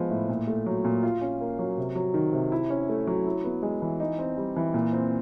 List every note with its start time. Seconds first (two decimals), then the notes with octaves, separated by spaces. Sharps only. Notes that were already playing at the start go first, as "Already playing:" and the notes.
Already playing: F3 G#3 B3
0.10 A2
0.29 A#2
0.47 A3
0.66 F#3
0.84 A#2
1.03 F4
1.21 C#4
1.40 A#3
1.59 F#3
1.78 C3
1.95 F#3
2.14 D#3
2.33 C3
2.52 E4
2.70 C#4
2.89 A3
3.07 F#3
3.26 E4
3.44 B3
3.63 G#3
3.82 E3
4.00 D#4
4.19 C4
4.37 G3
4.56 E3
4.74 A#2
4.93 C4